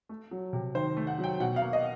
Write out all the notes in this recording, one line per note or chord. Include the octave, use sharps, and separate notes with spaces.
A3
F#3
C3
D#3 C5
A3
F#5
F#3
G5
B2 F#5
F5
A#3
D#5